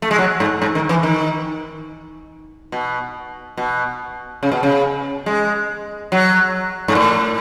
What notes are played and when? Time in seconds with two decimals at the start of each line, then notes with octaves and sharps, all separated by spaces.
0.02 A3
0.11 G#3
0.18 F#3
0.40 G#2
0.62 G#2
0.75 D#3
0.89 E3
1.03 D#3
2.72 B2
3.57 B2
4.43 C#3
4.52 B2
4.63 C#3
5.26 G#3
6.12 F#3
6.88 G#2
6.95 A2